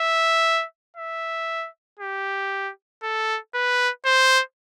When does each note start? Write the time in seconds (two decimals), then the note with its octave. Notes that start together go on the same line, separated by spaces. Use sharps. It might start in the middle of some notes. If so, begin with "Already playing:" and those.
Already playing: E5
0.97 E5
1.99 G4
3.03 A4
3.54 B4
4.06 C5